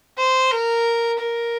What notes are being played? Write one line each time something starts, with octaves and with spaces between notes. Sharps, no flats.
C5
A#4
A#4